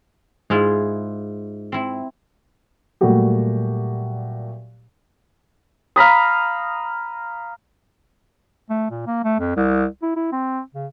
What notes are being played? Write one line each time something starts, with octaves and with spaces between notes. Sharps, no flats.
G#2 E4 F4 G#4
C4 E4
A#2 F#3 G3 A3 F#4 G4
F5 A#5 B5 D#6
A3
A#2
A#3
A3
F2
C2
E4
E4
C4
C#3